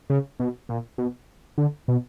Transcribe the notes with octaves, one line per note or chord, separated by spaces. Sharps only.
C#3
B2
A#2
B2
D3
B2